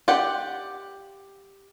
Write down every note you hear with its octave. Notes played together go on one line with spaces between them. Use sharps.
G4 D5 F#5 G5